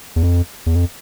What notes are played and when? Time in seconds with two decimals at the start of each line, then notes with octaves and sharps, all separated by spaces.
0.16 E2
0.23 F2
0.66 E2
0.75 F2